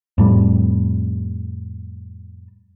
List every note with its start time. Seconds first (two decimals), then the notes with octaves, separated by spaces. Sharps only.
0.18 F2 A2 G3